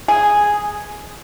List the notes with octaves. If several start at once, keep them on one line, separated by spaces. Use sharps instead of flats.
G#4